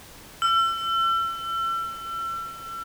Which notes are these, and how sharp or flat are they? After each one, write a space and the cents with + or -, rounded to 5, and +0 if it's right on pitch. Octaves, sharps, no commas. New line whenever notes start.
E6 +40